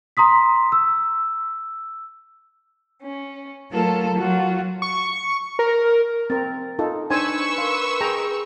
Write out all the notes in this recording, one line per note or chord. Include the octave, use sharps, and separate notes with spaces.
A#5 C6 D#6 B6
E6
C#4
F#3 A3 F4 A4 A#4
F#3 F4 F#4
C#6
A#4
C4 A#4 A6
D#4 F4 A4
D4 D#4 B4 C5 G#5 C#6 E6 G#6
A#4 F5 C6
G#4 G5 A#5